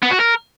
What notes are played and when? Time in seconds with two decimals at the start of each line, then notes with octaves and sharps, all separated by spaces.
0.03 B3
0.11 F#4
0.20 A#4